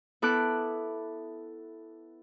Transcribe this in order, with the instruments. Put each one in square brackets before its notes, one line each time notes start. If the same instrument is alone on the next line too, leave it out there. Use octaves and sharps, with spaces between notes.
[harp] B3 E4 A4 D6 F#6